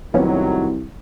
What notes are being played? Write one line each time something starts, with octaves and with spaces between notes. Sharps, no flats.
C2 A2 D#3 F3 F#3 B3 C#4